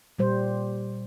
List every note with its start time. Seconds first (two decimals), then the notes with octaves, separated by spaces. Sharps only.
0.19 A#2 G3 C5